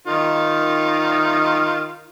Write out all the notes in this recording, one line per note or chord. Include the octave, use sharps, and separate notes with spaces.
D#3 D#4 F4